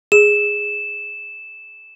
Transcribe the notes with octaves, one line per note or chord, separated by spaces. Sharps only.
G#4 E7